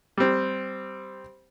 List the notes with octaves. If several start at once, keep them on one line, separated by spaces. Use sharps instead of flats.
G3 C4